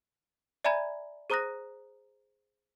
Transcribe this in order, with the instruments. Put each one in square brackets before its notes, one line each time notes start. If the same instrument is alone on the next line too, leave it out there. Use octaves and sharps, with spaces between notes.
[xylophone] D5 E5 G#5 A#5 B5 G#6
G#4 C5 A#5 D#6 F#6 A#6